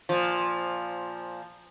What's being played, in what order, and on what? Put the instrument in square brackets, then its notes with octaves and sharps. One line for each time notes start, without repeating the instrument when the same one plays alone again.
[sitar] A#2 F3